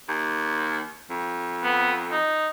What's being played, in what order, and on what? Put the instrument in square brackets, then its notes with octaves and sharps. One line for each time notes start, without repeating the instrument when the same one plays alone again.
[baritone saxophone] D#2
F2
[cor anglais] B3
D#4